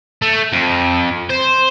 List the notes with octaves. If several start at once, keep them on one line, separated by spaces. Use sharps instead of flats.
A3
F2
C5